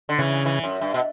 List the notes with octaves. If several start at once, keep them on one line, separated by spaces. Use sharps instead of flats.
D3
C#3 E3
E3
F#2
G2
B2